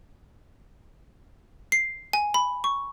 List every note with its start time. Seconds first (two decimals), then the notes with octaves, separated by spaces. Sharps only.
1.72 C7
2.13 G#5
2.34 B5
2.64 C#6